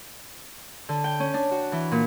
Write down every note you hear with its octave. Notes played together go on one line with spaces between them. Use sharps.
D3
G5
C#4
D4
F#4
E3
A#2